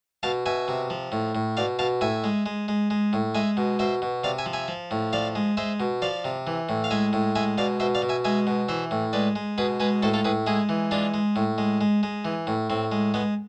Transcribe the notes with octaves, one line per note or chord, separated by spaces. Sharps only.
B2 F5 A5
B2 E5 G#5
C3
F3
A2
A2
B2 D5 F5
B2 F5 A5
A2 E5 G#5
G#3
G#3
G#3
G#3
A2
G#3 E5 G#5
B2
B2 C5 E5
B2
C3 D5 F5
E5 G#5
F3
E5 G#5
F3
A2
F3 D5 F5
G#3
G#3 C5 E5
B2
F3 D5 F5
C3
E3
A2
F5
G#3 E5 G#5
A2
G#3 E5 G#5
B2 D5 F5
B2 C5 E5
D5 F5
B2
E5 G#5
G#3 E5 G#5
B2
E3 C5 E5
A2
G#3 B4 D5
G#3
B2 G#4 B4
G#3 G#4 B4
A2 A4 C5
F4 A4
A2 G#4 B4
G#3 E4 G#4
E3
G#3 D4 F4
G#3
A2
G#3
G#3
G#3
E3
A2
A2 C4
G#3
G#3 B3